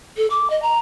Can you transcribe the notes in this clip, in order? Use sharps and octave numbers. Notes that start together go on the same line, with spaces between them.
A4
D6
D#5
A#5